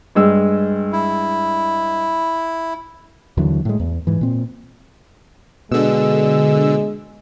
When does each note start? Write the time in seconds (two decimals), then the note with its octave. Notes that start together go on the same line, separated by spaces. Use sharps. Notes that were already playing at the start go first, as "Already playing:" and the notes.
0.15 G2 G#3 E6
0.93 E4
3.37 D#2 D3 E3 F#3
3.65 A2 G#3
3.80 E2
4.07 G#2 E3
4.21 A#2 C4
5.72 B2 D3 G#3 E6